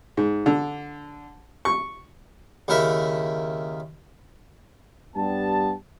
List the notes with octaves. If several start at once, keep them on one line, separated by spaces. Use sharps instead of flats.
G#2
D3
C#6
D#2 C#3 E4 A#4 E5
G2 G3 B3 G4 A5